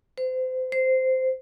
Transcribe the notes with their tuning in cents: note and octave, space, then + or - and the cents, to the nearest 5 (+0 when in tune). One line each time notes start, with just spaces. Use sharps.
C5 -30
C5 -10